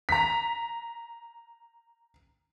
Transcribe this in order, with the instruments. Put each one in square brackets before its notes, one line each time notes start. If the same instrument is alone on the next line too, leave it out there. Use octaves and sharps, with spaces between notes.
[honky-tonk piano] A#5 B6